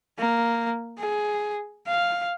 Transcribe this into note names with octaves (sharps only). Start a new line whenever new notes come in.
A#3
G#4
F5